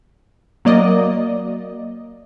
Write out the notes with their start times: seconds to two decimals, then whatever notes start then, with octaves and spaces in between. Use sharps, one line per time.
0.65 F#3 A#3 D5 D#5